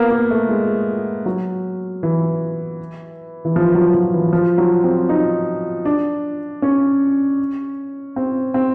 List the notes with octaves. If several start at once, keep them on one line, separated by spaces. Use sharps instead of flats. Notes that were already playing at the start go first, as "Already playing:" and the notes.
Already playing: A#3 B3
A#3
A3
G#3
F#3
E3
E3
F3
F#3
F3
E3
F3
F#3
C4
D#4
D4
C#4
C4
C4